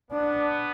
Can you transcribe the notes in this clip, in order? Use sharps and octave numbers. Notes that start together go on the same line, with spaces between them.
B3 D4